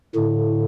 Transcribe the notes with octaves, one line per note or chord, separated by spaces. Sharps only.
A2 D3